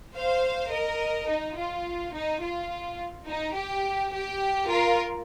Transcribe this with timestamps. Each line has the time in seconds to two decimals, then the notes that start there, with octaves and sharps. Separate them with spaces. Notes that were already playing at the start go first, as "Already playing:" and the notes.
0.15 C5 F5
0.72 A#4 D#5
1.29 D#4
1.58 F4
2.14 D#4
2.43 F4
3.28 D#4
3.56 G4
4.13 G4
4.69 F4 A#4